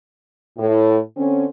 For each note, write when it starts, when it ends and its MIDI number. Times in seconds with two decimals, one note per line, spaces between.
0.58 0.98 45
1.17 1.45 50
1.17 1.45 60
1.17 1.45 61